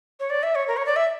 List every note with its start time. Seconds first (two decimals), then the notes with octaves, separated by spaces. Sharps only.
0.20 C#5
0.30 D5
0.43 E5
0.55 C#5
0.68 A#4
0.77 C#5
0.86 D5
0.96 E5